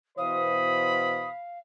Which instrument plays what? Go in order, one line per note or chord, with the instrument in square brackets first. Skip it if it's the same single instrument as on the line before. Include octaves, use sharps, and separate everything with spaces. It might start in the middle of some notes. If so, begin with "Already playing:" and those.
[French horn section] B2 E3 C5 [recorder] F5 [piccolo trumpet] B5 [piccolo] D#6